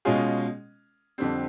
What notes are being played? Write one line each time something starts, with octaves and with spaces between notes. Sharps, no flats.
B2 G#3 C#4 F4 G#4
F2 D3 G3 C4